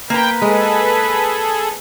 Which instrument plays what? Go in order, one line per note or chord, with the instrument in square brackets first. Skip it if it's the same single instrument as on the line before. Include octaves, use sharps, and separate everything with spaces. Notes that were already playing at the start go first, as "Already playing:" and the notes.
[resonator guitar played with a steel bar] A#3 A#5 [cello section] B4 [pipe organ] G5
[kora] G#3 [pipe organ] G#4 A4